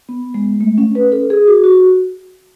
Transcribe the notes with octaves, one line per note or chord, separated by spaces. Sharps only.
B3
G#3
A3
C#4
B4
A4
G#4
F#4
F#4